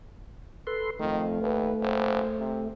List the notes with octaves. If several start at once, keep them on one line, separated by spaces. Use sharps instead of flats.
A4 B4 C6
F2 D#3 A3
D#2 B4
F#1 C5
C3